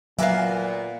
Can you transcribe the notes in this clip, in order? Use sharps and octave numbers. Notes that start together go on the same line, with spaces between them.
A#2 F#3 A#3 B3 E5 F5 G#5